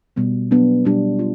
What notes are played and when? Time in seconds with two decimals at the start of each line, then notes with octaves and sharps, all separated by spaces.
0.16 B2 G3 B3
0.51 F#3 B3 D4
0.85 B2 G3 B3 D4 G4
1.19 F4